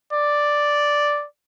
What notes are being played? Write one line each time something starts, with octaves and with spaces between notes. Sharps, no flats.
D5